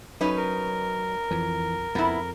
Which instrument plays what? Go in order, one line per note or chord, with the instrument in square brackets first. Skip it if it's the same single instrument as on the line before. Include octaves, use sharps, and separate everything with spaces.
[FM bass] F#3 [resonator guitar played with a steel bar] C#4 D#4 B4
[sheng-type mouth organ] A#4
[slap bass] F2 [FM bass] E3
[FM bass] E1 [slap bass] F2 [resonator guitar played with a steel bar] B3 E4